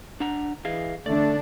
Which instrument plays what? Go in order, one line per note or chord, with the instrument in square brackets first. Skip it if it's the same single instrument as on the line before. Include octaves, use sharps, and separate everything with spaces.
[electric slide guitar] D4 F#5 A#5
[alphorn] E3 [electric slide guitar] G#4 D#5 F5
[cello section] D3 D4 [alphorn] A3 [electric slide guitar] D5